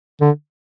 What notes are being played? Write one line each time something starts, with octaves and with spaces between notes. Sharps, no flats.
D3